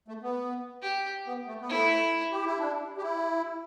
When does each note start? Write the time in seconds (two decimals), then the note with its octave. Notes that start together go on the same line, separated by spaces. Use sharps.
0.08 A3
0.23 B3
0.82 G4
1.27 B3
1.47 A3
1.61 B3
1.70 A3 E4
2.32 G4
2.46 E4
2.59 D4
2.98 G4
3.02 E4